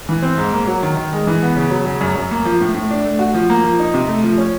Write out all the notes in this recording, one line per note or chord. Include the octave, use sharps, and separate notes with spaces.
E3
C4
G#2
A#3
F#3
D#3
D#3
G#3
E3
B3
C#3
F#3
C#3
F#2
F#2
A#3
F3
A2
A2
D4
A3
F#4
F3
A#3
F3
D#4
C3
A3
F3
C#4